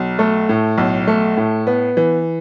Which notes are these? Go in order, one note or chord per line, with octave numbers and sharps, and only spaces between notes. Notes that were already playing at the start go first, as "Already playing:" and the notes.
Already playing: B1
A3
A2
B1
A3
A2
B3
E3